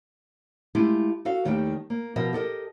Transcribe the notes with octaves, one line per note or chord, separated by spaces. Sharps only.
G#3 A3 E4 F4 G4 E5
F#4 A4 E5 F5
D#2 D#3 G3 A3 G4 G5
A#3
B2 F3 A#4 D#5 E5
G4 A4 A#4 D#5